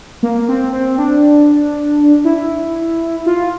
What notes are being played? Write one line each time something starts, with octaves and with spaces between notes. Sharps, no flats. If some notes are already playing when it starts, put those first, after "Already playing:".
A#3
C4
C4
D4
E4
F4